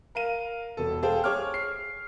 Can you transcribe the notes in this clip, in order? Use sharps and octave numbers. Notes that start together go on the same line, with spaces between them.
A#4 F5 D#7
E1 A4
G#4 A4 C5 F5 G5 A5
G#4 C#5 D6 F6
C7